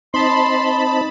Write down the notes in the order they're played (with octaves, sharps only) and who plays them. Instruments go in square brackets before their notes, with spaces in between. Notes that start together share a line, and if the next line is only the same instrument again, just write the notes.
[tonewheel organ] C4 D#4 [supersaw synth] A5 B5 [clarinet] C6